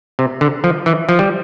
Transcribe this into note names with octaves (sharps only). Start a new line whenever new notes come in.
C3
D3
F3
E3
F3
G3